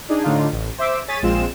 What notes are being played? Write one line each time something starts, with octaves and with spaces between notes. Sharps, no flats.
D4 D#4 G#4
A2 D3 D4 D#4 F4
A1
C5 E5 D6 E6
G#4 C#5 A6 B6 D#7
A#1 G#3 C4 F4 E7